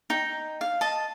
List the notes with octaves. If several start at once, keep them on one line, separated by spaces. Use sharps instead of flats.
D#4 G5
F5
D#5 A5